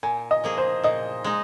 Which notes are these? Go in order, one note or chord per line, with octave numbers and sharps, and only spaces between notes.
A#2 G#5
D#5
F3 A#3 G#4
C5
A#2 D#5
G#3 D#4